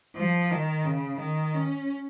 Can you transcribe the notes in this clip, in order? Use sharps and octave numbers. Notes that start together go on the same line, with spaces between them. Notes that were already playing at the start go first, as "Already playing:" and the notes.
F3
D#3
C#3
D#3
C#4